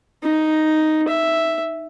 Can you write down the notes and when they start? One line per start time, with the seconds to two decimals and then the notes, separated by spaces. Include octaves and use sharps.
0.23 D#4
1.08 E5